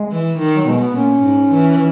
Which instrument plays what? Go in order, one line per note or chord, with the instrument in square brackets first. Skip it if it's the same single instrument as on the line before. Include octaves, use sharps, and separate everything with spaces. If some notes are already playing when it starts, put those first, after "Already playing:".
Already playing: [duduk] G#3
[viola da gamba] E3
D#3
[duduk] F#3
[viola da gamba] B2 [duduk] G#3
[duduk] B3
[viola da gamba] A#2 [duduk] C#4
[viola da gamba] G#2
E3